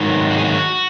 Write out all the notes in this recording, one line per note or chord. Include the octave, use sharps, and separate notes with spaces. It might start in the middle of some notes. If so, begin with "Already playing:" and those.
Already playing: G#2 D#3 F#3
F#4
G#4
F#4